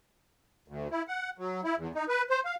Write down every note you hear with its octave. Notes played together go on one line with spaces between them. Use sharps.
D2
E4
F#5
F#3
E4
E2
D#4
B4
C5
F5